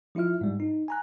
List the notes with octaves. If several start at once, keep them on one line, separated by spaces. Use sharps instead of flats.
F3 E4 F4 E5 F6
G#2 G3
D#4
G#5 A#5 F#6